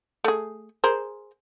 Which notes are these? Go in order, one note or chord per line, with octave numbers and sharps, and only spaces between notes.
A3 G#4
G#4 A#4 C5